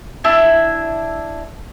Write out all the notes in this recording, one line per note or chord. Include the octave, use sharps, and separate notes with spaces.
D4 E4 E5 A5